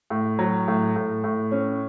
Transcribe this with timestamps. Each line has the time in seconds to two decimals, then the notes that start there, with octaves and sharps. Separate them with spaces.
0.10 A2
0.39 F#3
0.68 A2
0.96 A2
1.24 A2
1.52 C#4